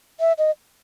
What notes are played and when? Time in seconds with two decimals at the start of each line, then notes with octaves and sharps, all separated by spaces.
0.20 E5
0.38 D#5